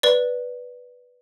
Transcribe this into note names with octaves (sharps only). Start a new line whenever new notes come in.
B4 D5